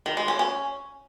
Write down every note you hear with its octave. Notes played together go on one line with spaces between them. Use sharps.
D#3
G#3
C#4
C#4